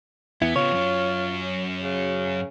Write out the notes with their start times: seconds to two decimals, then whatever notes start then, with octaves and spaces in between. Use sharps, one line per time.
0.42 E2 B3 E4
0.56 C#3 B3 F4 C#5
0.72 F#2 C#4
1.82 C#3